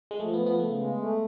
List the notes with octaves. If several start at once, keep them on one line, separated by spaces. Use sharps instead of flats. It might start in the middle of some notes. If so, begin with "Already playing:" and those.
G#3
F3 A3
B3
F3
B3
C#3 A3
G#3
A3